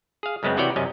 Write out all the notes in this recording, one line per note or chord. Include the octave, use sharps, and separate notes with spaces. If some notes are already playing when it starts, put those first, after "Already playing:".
G#4 F5
F#2 C#3 G#3 B3 C4
C3 E3 F#4 C#5 D5 G5
F#2 C3 C#4 D#5